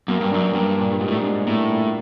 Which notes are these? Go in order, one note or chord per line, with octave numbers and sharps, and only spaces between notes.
F#2 A#3
G2
F#2 D4
G2 A#3
A#2
G#2 G3
A2
G#2
D4
A2 A#3
A#2